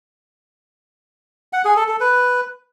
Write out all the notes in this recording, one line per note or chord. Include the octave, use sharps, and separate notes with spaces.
F#5
G#4
A4
A4
B4